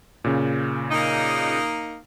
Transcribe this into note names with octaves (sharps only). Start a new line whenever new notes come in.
A#2 C#3
A#3 D#4